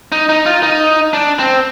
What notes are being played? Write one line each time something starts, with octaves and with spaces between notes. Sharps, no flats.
D#4
D#4
F4
D#4
D4
C4